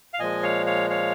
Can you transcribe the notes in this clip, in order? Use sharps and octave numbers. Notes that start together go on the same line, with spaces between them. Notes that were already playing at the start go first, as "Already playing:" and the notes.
F5
A#2 F3 G#3 D#5 G#5
C#5 F5
C#5 F5
C#5 F5